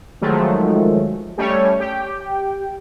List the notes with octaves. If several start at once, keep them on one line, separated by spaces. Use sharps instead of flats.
D#3 F3 F#3 G#3 A3
G3 A3 C#4 C#5
G4 G5